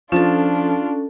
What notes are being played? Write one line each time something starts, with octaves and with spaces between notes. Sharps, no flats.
F3 C#4 D4 F4 A4